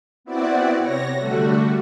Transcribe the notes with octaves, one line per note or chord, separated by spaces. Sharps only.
B3 C4 E4 F#4 D5 F#5
C3 C#5 A#6
D3 G3 A3 F#4